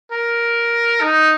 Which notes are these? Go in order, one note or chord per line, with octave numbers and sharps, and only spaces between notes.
A#4
D#4